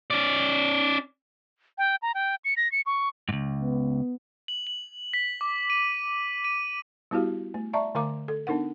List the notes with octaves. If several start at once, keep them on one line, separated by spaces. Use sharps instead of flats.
C#4 D5
G5
A#5
G5
C#7
A#6
C#7
C#6
C#2 G#2
B3
F#7
F#7
B6
D6
D#7
D#7
G3 B3 E4 F#4 G4 F5
A3
D5 E5 A5 A#5 C#6
D3 A3 A#4 F5 A#5 D6
A4
B3 D4 D#4 A#4 F#5